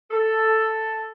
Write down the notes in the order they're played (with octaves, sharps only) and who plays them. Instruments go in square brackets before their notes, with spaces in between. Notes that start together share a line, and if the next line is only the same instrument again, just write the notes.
[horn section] A4